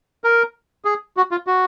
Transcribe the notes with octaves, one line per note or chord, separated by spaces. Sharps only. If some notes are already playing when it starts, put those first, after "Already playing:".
A#4
G#4
F#4
F4
F#4